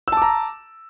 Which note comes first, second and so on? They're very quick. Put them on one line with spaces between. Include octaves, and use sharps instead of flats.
E6 A5 D6 A#5